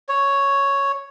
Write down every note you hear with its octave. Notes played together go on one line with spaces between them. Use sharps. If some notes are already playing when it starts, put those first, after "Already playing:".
C#5